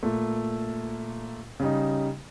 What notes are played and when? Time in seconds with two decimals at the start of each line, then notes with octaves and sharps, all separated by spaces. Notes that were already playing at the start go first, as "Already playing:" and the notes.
0.03 A#2 A3
1.60 C#3 G3 D#4